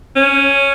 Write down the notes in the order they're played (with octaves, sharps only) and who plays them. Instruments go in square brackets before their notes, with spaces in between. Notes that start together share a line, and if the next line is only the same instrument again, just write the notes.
[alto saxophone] C#4